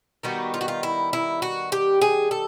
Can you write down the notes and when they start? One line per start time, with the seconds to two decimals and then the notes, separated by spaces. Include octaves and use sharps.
0.23 D#3 G3 B3 D#4 F#4
0.54 F4
0.61 F#4
0.68 F4
0.83 E4
1.13 E4
1.42 F#4
1.72 G4
2.01 G#4
2.31 A4